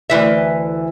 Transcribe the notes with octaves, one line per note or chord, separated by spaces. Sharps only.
D2 E3 E5